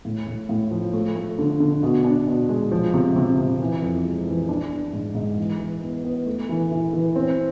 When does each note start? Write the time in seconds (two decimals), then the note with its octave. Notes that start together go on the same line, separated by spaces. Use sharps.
0.05 A2
0.27 A2
0.49 A2
0.71 F3
0.93 A3
1.16 A3
1.38 D3
1.60 D3
1.83 B2
2.04 D4
2.27 B2
2.49 G#3
2.71 F3
2.94 C3
3.16 C3
3.38 C3
3.60 E3
3.82 F2
4.04 G#3
4.27 E3
4.49 D4
4.71 D4
4.93 G#2
5.15 G#2
5.37 E3
5.60 E3
5.83 B3
6.04 B3
6.26 A3
6.49 E3
6.71 E3
6.93 E3
7.16 C4